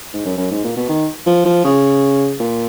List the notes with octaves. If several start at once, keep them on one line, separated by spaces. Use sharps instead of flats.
G#2
F#2
F#2
G#2
A#2
B2
D#3
F3
F3
C#3
A#2